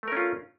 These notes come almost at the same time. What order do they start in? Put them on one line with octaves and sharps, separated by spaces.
A3 A#4 C#4 F4